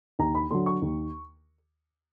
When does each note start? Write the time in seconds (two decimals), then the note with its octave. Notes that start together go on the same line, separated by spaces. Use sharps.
0.19 D#2 A#5
0.35 B5
0.51 D3 F#3 C6
0.66 C#6
0.82 D#2